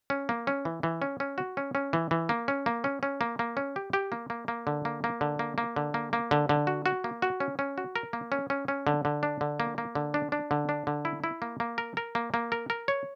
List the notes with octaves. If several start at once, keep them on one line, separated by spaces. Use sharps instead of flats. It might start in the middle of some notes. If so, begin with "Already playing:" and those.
C#4
A#3
C#4
E3
E3
C#4
C#4
F#4
C#4
C#4
E3
E3
A#3
C#4
A#3
C#4
C#4
A#3
A#3
C#4
G4
G4
A#3
A#3
A#3
D3
A#3
A#3
D3
A#3
A#3
D3
A#3
A#3
D3
D3
F#4
F#4
A#3
F#4
C#4
C#4
F#4
A#4
A#3
C#4
C#4
C#4
D3
D3
D4
D3
A#3
A#3
D3
D4
D4
D3
D4
D3
E4
E4
A#3
A#3
A#4
A#4
A#3
A#3
A#4
A#4
C#5